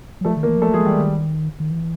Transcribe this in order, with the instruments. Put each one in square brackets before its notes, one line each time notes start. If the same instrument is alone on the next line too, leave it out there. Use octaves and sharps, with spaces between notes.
[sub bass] F#3
[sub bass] F3 [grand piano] A3 A4
[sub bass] D#3
[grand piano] A#3 A#4
[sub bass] E3
F#3
[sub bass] F3 [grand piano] A3 A4
[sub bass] F3 [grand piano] G#3 G#4
[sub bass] E3 [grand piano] G3 G4
[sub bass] D#3
D#3
E3